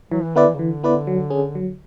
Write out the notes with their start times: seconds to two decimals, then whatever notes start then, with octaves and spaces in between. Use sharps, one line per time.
0.12 E3 F#3
0.23 E3
0.36 D3 B3 E4 B4 D5
0.48 E3
0.54 C#3
0.59 D3 E3
0.83 B3 E4 B4 D5
1.07 F#3
1.30 C#4 G#4
1.55 F#3